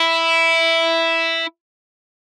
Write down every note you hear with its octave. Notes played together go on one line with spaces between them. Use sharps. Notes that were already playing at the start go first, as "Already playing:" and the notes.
Already playing: E4